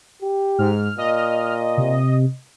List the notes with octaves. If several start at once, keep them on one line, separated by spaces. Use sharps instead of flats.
G4
G#2 F6
A#2 D#5
C3